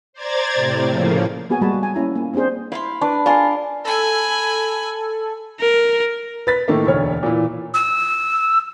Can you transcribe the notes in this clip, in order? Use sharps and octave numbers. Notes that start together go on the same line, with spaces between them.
C5 D5 A#5 G#6 A6
A2 C3
A2 C#3 F3 A#3
A#3 B3 F#4 G#4 G#5
G3 G#3 A#3 F#4 A5 B5
G#5
A#3 C#4 E4 A#5
A#3
A#3 C4 D4 G#4 C5
E4 F5 B5 C6
D4 B4 D5
F4 G#4 A#4 D5 F5
A4 G#5 B5
A#4
B4 A6 B6
A2 D#3 A3 A#3
E1 D2 C#5 F6
A#2 E3
E6